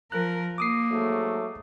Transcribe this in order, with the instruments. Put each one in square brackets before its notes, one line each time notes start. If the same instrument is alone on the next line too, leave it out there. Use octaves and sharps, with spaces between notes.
[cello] F3 A#4 [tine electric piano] F#6
[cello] A#3 [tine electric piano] D6 D#6 C7
[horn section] G#2 F#3 A3